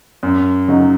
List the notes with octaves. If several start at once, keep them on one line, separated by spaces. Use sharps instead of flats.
F#2
C#3 F#3 D#4